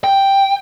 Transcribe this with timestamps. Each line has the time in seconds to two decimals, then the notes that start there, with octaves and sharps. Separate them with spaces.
0.04 G5